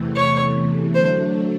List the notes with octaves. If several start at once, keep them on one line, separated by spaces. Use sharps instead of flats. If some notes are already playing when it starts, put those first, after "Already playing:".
Already playing: E2 C3 E3 A3
C#5
D3 F#3 A3 D4 C5